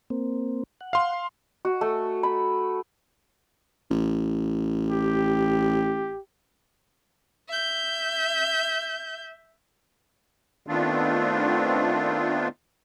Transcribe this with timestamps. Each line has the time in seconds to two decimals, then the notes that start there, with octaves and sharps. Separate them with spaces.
0.10 A#3 C4
0.81 F#5
0.93 F5 C6
1.65 F#4
1.81 A3
2.23 B5
3.91 A1
4.88 G4
7.49 E5 G6
10.67 D#3 A3 B3 C4 D4 F4